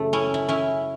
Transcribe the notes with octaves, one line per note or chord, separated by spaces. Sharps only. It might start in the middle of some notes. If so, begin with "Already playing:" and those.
Already playing: F#2 C#3 E3 A3
C#4 E4
E4
C#4 E4